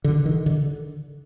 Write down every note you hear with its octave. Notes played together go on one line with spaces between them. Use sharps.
D3
D#3
D3